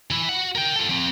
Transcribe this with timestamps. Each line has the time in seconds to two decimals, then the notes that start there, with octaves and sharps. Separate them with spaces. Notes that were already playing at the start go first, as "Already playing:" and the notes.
0.11 E3 E4
0.29 F#4 F#5
0.55 A#4 G5
0.76 F4 A4
0.89 F3 C4